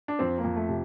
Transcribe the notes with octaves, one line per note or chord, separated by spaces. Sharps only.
D4
F2 C4
A#3
F2
A3
C3